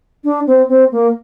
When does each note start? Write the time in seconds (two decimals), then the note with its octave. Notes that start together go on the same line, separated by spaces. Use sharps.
0.24 D4
0.47 C4
0.69 C4
0.92 A#3